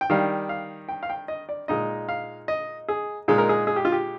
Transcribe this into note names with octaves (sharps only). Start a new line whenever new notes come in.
G5
D#3 G3 D4 F5
F5
G5
F5
G5
D#5
D5
A#2 G#3 D#4 D#5
F5
D#5
G#4
A#2 G#3 D#4 G#4
A#4
G#4
G#4
G4
F4
G4